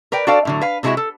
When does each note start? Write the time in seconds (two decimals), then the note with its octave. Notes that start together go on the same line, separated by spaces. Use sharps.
0.12 A#4 B4 D5 G5
0.27 D4 F#4 A4 C5 D5 F5
0.45 A2 D3 F#3
0.61 B4 F5
0.83 C3 D#3 G#3 E4 F#4 E5
0.97 A4